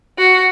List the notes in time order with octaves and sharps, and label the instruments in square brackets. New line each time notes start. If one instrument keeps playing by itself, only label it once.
[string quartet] F#4